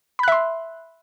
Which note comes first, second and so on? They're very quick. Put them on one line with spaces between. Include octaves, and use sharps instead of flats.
B5 F#6 E5 C6